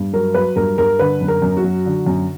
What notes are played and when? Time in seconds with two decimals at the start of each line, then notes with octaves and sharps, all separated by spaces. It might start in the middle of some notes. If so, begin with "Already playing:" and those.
Already playing: G2
0.13 F#3 A#4
0.34 F#3 B4
0.56 G2 A#4
0.78 G2 A#4
0.99 D3 B4
1.21 F#2
1.28 A#4
1.42 F#2
1.57 F#4
1.64 F#3
1.86 D3
2.06 F#2